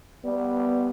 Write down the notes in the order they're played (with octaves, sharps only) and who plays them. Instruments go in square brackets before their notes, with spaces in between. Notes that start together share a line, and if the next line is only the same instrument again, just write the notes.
[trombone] G3 [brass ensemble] B3